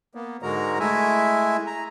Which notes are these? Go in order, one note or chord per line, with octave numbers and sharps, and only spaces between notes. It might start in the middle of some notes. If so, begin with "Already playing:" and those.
A#3 B3
G#2 D3 G#3 F#4 A#4 A#5
G#3 A3 E4 E5 G#5
A#5